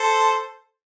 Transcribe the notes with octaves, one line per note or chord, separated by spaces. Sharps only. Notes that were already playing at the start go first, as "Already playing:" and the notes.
Already playing: A4 C5